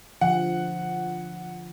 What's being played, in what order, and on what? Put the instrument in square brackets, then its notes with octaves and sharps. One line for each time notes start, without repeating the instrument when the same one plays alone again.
[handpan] D3 F3 [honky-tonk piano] F#5